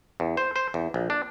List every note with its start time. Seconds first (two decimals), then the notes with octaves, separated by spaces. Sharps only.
0.20 E2
0.37 C5
0.56 C5
0.74 E2
0.94 A#1
1.10 D4